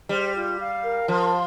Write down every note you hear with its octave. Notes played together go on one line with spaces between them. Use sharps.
G3 C5
F4
F5
A#4
F3 C6